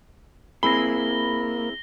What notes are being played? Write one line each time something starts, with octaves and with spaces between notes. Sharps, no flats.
A#3 C4 E4 G#4 B5 A#6 G7